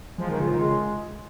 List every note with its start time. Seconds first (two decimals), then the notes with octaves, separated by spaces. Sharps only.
0.18 F3 G#3
0.29 D#3
0.39 C#3 F4
0.48 D#3
0.59 C#3 G#3